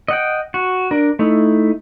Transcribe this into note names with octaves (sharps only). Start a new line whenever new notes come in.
D#5 F#5 G5
F#4
D4 A#4
A3 D#4 E4